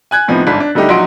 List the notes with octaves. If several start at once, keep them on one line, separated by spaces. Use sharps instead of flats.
G#5 F#6 G#6
A2 C3 F3 B3 D#4
G1 G#2 D4 B5 B6
D4
D3 G3 A3 D#4 G4
A#1 F#3 D#4 F#5 C6 D7